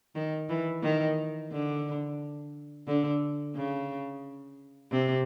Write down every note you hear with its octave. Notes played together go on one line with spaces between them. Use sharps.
D#3
E3
D#3
D3
D3
C#3
C3